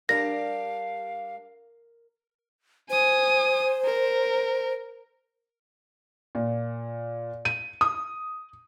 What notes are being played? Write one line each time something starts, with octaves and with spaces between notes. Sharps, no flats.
G3 D4 G4 A#4 F5 A#6
C5 G#5 D#6
A#4
A#2
D#7
D#6